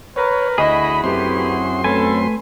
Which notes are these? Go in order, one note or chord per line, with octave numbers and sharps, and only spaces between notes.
A#4 B4 C#5
D2 E4 F#4 G#4 D#5 B5
F#2 A3 B3 C4 G4 C6
A3 C#4 A4 B4 G#5